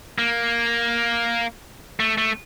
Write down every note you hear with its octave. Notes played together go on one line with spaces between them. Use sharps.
A#3
A3
A3